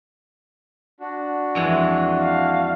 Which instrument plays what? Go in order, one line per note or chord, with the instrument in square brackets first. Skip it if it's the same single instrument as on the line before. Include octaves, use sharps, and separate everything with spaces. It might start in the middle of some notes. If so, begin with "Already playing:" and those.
[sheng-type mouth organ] D4 F#4
[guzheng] F2 E3 G#3
[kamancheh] F5